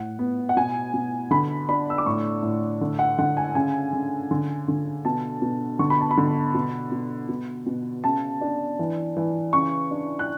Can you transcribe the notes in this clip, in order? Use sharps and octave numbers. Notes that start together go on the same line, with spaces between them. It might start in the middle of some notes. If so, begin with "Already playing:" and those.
Already playing: A2 F#5
B3
F#5
B2 G#5
B2
D3 B5
D4 B5
E6
D6
A2 C#6
A2
D3
F#5
D3 F#5
G#5
C#3 G#5
C#3
D3
D3
B2 A5
B2
D3 C#6
B5
A5
B5
D3
B2
B2
B2
B2
C#3 A5
D4
E3
E3
C#3 C#6
D4
F#6